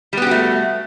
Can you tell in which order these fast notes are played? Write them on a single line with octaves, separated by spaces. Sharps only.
G3 B3 G4 F#4 A3